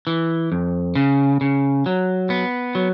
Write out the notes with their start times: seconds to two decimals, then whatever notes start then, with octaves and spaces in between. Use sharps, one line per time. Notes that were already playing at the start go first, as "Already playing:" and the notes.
0.07 E3
0.52 F2
0.95 C#3
1.41 C#3
1.86 F#3
2.30 B3
2.75 F#3